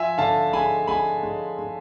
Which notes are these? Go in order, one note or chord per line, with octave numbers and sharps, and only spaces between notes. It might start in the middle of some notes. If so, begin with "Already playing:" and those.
Already playing: F3 E5 G#5
D3 F5 A5
G#3 G#5 B5
G#3 G#5 B5
G#3
G#3